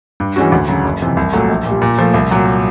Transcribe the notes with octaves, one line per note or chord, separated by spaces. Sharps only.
G2
E3 G#3 C#4 F#4
D2
C#3 F#3
F#1
F2 C3 E3
C2
A#2 F#3 A3
A#1
A#2
G3
A#2
F3 A3
C2
A#2 F#3